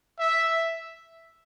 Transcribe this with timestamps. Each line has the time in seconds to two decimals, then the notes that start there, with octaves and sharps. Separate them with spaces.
0.19 E5